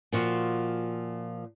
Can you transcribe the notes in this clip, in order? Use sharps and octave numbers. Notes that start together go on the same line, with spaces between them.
A#2 F3 F#4